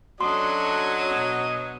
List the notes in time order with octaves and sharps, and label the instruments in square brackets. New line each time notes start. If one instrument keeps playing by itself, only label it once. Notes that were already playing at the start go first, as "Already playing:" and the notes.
[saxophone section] F#3 [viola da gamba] C#4 D4 A4 [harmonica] D#5 [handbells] C6
[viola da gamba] B2